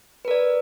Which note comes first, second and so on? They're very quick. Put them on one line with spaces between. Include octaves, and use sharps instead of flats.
B4 A#4 D5